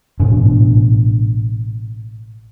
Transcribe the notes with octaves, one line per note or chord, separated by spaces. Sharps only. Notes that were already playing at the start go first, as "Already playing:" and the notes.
A1 G#2 B2 D4